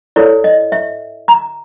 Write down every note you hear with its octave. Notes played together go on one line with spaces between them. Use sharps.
E4 A4 C#5 D5
D#5
E5
A#5